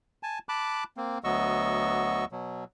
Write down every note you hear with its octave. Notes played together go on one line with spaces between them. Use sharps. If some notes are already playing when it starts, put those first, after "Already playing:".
G#5 A5
A5 B5 D6 F#6
A#3 C4
D2 F#3 B3 D#5 C#6 E6
B2 F#3